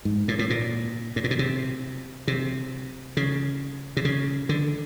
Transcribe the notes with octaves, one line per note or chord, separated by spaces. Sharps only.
G#2
A2
A2
A#2
A2
A#2
B2
C3
C3
C#3
C3
C#3
D3